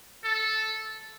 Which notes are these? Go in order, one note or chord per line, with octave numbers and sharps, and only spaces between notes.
A4